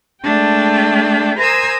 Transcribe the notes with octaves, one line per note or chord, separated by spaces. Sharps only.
G#3 A3 D4 G5
A#4 C5 G#5 A#5 D#6 E6